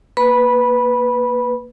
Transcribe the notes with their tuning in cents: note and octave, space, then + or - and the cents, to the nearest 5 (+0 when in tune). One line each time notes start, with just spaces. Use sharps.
A#3 +0 B4 +0 B5 -15